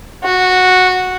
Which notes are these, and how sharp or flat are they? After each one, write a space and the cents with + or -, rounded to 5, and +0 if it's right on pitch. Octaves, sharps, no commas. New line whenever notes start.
F#4 -10